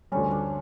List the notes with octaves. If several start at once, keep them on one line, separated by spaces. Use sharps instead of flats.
D2 D3 G3 C#4
D4